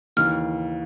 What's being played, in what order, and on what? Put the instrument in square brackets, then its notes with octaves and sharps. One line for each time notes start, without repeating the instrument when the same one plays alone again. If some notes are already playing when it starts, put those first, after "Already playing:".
[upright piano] D#2 C#3 E3 [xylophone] F6